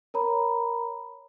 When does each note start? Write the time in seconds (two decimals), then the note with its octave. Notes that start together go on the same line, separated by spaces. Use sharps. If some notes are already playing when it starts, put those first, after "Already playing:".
0.14 A#4 C#5 A#5 B5